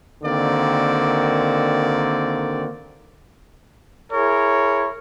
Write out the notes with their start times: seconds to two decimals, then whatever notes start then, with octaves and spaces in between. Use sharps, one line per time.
0.23 D3 D#3 A#3 C4 F#4 D5
4.12 E4 G#4 A#4 C#5